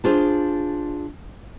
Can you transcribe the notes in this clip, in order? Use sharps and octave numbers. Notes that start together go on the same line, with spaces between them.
D4 F4 G#4 C5